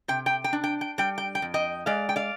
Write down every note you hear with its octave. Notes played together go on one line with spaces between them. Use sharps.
C3 G5
G5
G5
D4
G5
G5
G3 G5
G5
G5
F2
D#5 G5
G#3 D5 F5
G5
D5 F5